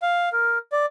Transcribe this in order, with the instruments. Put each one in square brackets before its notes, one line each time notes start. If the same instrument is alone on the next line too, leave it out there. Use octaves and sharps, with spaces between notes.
[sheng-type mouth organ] F5
A#4
D5